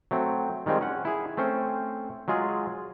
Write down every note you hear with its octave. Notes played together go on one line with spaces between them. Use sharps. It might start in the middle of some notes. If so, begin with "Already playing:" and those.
F#3 A3 C4
D#3 G3 G#3 C4 F4
C#4 F#5
E4 G#4
A3 C4 C#4 C5
F#3 G#3 F4 G#4